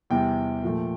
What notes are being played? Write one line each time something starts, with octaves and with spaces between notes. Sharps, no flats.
E2 C3 G3 G5
A#2 F3 A3